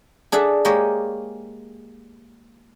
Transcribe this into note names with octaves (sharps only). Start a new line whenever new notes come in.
D4 G#4 A4 E5 F#5
G#3 A#3 G4 C#5 D#5